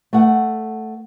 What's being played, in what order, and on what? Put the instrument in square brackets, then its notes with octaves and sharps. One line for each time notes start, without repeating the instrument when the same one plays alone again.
[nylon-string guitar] A3 F#5